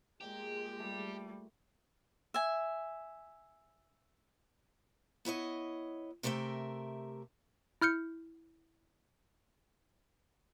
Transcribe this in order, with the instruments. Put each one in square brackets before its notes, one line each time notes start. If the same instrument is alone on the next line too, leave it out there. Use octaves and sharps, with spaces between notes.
[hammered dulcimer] A#2 G5 A#5 [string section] G#3 [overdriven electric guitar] G4
[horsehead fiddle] G3 [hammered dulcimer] A3
[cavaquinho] E5 G#5
[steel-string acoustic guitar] B3 E4 C#5 D#5
C3 A3 G4 A#4 E5
[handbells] E4 F6 G6 C#7